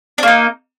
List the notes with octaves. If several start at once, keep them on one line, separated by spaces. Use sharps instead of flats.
A#3 D4 D#4